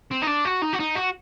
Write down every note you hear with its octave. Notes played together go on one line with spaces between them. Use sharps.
C4
D#4
D4
F#4
D#4
F#4
D#4
F#4